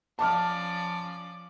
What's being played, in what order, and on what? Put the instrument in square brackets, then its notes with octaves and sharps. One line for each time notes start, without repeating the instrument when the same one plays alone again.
[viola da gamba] F3 C#4 D5 [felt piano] A5 D6 F6